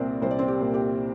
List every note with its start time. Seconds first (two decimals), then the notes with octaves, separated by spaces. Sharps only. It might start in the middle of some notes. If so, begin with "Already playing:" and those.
Already playing: C2 A#2 C4 C5 D5
0.22 C2 C5
0.31 D5
0.39 C4 C5
0.48 G4
0.61 A#2
0.74 G4